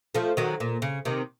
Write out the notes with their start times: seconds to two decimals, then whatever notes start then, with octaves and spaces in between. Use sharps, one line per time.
0.15 F3 A3
0.37 D#3 F#3
0.60 A#2
0.82 C#3
1.05 C3 D#3